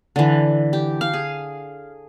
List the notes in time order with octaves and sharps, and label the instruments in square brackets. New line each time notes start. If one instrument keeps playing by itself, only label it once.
[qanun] D3 E3
G4
F5
G#4